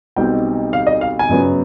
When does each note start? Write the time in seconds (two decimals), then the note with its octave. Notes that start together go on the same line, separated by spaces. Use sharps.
0.16 B1 B2 G3 C4 D#4 G5
0.73 F5
0.87 D#5
1.01 F5
1.19 G#5
1.29 G1 F#2 C#3 F#3 B3